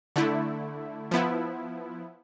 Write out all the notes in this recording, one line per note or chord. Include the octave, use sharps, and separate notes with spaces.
D3 A3 E4
F3 B3 E4